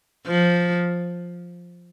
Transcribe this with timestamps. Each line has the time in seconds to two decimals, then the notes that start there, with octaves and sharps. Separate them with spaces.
0.27 F3